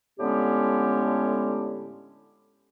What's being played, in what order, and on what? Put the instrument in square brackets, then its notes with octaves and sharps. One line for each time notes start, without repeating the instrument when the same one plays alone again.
[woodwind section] A2 D3 G#3 B3 C#4 G4